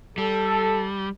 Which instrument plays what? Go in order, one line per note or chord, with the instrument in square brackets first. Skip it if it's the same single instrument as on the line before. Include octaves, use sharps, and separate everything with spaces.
[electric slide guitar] G3 [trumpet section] A4